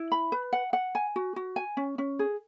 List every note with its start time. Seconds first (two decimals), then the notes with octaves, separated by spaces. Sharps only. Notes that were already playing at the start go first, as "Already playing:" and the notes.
Already playing: E4
0.12 B5
0.32 B4
0.53 F#5
0.73 F#5
0.95 G#5
1.16 F#4
1.36 F#4
1.56 G#5
1.77 C#4
1.98 C#4
2.19 G#4